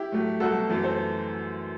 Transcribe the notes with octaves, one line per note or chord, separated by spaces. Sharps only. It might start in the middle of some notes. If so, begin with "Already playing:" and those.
Already playing: E4 G4
A2 F#3 A3
C2 B2 F#3 A3 F#4 A4
F#2 E3 A3
A4 C5